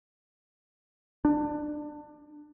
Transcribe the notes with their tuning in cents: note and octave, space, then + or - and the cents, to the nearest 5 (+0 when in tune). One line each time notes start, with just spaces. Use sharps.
D4 +20